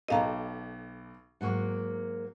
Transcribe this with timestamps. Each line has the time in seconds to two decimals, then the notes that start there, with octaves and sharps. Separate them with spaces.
0.08 B1 G4 A4 D#5 F5 A#5
1.41 G#2 F#3 A#3 F#5 C#6